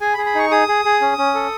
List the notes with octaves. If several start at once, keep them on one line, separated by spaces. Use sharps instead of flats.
G#4 G#5
B5
G#4
B5
D#4 C#6
G#4 D#6
G#4
G#4
C#4
C#4
A4